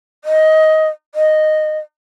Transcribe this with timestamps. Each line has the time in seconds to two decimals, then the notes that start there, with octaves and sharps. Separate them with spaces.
0.25 D#5
1.15 D#5